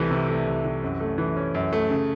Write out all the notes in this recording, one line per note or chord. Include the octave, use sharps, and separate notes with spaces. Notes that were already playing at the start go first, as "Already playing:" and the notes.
Already playing: C2 E3 A3
C3
A3
C2
E3
F#2
A3
E3
C#4
F#2
A3
C#3